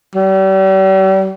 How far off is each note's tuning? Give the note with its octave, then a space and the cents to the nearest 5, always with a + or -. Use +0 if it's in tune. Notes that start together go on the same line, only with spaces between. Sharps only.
G3 -40